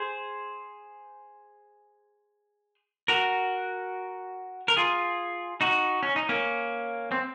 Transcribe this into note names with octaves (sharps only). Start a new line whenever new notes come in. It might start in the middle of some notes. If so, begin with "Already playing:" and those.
Already playing: G#4 C5
F#4 A#4
A#4
F4 G#4
D#4 F#4
C#4
D#4
A#3 C#4
C4